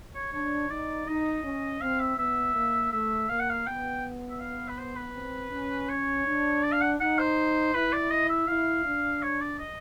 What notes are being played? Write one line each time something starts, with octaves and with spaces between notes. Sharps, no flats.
C#5
D4 C#5
D#4 D5
D#4 D#5
C#4
C4 F5
E5
B3 E5
A#3
A3 E5
A#3 F5
F#5
F5
B3 G5
E5
F5
B4
C5
B4
C4
C#4
C#5
D4
D5
F5
F#5
D#4 F#5
C5
E4 B4
D5
D#5
E5
E4 F5
D4
C#5
D5
D#5